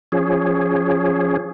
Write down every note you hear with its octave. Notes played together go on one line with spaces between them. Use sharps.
F3 C#4 G#4